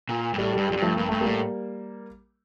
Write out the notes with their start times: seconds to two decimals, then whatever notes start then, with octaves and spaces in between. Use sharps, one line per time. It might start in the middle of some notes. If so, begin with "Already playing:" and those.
0.09 A#2
0.34 G2
0.38 A2 G3
0.53 G2 G3
0.68 F2 G3
0.77 G2
0.82 F3 A3
0.97 G2 A#3
1.09 G2 A3
1.21 G3 A#3
1.26 A2